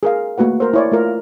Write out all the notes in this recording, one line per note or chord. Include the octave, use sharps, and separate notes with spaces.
G#4 A#4 F5
A3 A#3 F#4 B4 F#5
A#4 C5
E4 C#5 D5
A3 F4 A#4